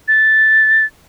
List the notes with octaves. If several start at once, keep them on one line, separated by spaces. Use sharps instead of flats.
A6